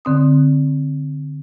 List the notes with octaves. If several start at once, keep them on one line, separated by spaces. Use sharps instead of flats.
D3 C4 D#6